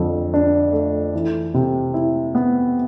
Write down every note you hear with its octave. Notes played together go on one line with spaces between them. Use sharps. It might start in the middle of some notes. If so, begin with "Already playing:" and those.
Already playing: F2 D3
D4
A3
E3
C3
E4
B3